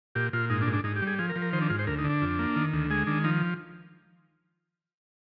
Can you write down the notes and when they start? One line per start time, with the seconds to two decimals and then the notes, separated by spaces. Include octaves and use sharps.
0.15 A#2 G4
0.33 A#2 F4
0.50 G#2 D#4
0.61 D4
0.67 G#2
0.73 D4
0.84 G#2 D#4
0.96 G4
1.02 G3
1.07 G#4
1.18 F3 G#4
1.29 A#4
1.36 F3
1.42 A#4
1.53 D#3 C5
1.61 D4
1.70 G#2 F4
1.79 C5
1.87 D2 A#4
1.98 D#4
2.04 D3
2.10 D4
2.22 F2
2.39 A#3
2.56 D#3
2.73 D2
2.90 G#3 G#4
3.07 D#3 D4
3.24 F3 D#4